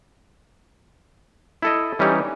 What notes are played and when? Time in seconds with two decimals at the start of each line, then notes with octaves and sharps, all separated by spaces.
1.62 E4 A4 D#5
1.99 E3 G3 C#4 D#4 G4